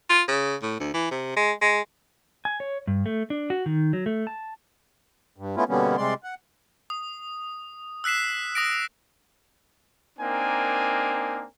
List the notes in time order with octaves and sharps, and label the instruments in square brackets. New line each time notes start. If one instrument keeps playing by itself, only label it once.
[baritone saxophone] F4
C#3
A2
D2
E3
C3
G#3
G#3
[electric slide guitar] G#5
C#5
G2
A3
D4
F#4
D#3
F#3
A3
A5
[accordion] G2
A3 B3 C#4 E4 F4
B2 D3 G3 A#3 B3 C#4
C3 G3 G#3 D5 C6
F#5
[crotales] D#6
E6 F#6 B6 C7 E7
D#6 A#6 D7
[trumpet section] A#3 C4 D4 D#4 A#4 G#5